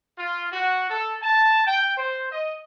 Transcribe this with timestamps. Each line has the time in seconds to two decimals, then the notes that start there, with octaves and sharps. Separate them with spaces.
0.18 F4
0.52 F#4
0.89 A4
1.22 A5
1.66 G5
1.97 C5
2.30 D#5